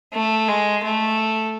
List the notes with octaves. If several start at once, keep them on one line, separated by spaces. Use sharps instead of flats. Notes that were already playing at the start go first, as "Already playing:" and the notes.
A3
G#3
A3